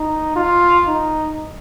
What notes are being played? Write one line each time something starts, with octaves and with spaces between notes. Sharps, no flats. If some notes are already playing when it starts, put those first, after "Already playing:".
Already playing: D#4
F4
D#4